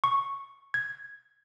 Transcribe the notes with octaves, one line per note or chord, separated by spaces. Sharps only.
C#6
G#6